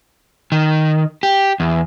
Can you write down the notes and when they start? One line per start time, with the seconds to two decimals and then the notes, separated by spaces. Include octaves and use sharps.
0.52 D#3
1.23 G4
1.60 E2